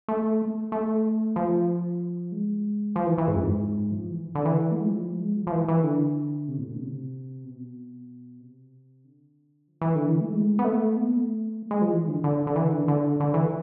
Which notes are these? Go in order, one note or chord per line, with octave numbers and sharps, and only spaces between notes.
A3
A3
F3
G#3
F3
E3
E3
G#2
F2
G#2
F3
E3
D3
E3
A3
G#3
F3
G#3
F3
F3
E3
E3
D3
C3
A2
B2
D3
C3
B2
C3
B2
C3
D3
F3
E3
D3
E3
A3
G#3
B3
A3
B3
A3
G#3
F3
E3
D3
D3
D3
E3
D3
D3
D3
E3